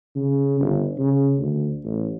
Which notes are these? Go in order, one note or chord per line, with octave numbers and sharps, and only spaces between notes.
C#3
G1
C#3
D2
A1